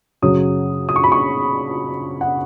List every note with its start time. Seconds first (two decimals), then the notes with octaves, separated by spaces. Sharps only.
0.22 F#2 C#3 F#3 D#6
0.89 D#6
0.96 C#6
1.04 B5
1.12 C#6
2.21 F#5